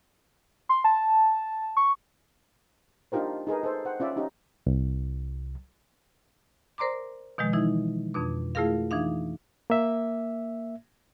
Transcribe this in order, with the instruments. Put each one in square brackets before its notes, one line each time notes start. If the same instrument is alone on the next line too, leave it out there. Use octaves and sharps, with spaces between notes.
[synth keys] C6
A5
C#6
[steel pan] D4 D#4 F4 G4 A#4 C5
D#4 G#4 A#4 B4
A4 C5
C5 F#5 G5
C#4 F4 D5 E5
C#4 D#4 G4
[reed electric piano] C2
[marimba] A#4 C5 D5 A#5 C6 D6
B2 D#3 F3 G#3
E3 D#4 E4
F2 B2 D4
A3 E4 F4 G#4 A#4 F5
E3 D4 D#4 F5
[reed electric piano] A#3 E5